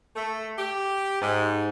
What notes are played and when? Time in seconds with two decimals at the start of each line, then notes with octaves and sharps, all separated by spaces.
0.16 A3
0.58 G4
1.21 G#2